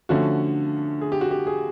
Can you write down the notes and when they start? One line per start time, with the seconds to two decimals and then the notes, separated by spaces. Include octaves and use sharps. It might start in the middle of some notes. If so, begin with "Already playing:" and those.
0.09 D3 F3 A3 C#4 F#4
1.01 G#4
1.12 G4
1.21 F#4
1.31 G4
1.47 G#4